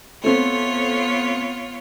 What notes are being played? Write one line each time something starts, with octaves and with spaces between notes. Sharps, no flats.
A3 B3 C4 F4 C#5